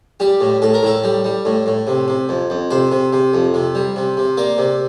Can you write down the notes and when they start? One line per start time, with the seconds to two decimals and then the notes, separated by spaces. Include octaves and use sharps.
0.20 G3 G4
0.41 A2
0.62 A2 A4
0.74 A#4
0.83 A2 A4
1.04 G3
1.24 G3
1.45 A2
1.66 A2
1.87 C3
2.08 C3
2.29 F2
2.50 F2
2.71 C3 C5
2.92 C3
3.13 C3
3.34 F2
3.54 C3
3.75 G3
3.96 C3
4.17 C3
4.37 A#3 D5
4.58 C3